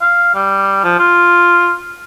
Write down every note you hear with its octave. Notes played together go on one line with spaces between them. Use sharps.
F5
G3
F3
F4